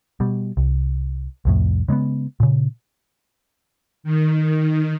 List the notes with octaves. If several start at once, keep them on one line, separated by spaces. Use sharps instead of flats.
B2 G3
C2
C2 F2 A2
C#3 G#3 A#3 B3
A#2 C#3
D#3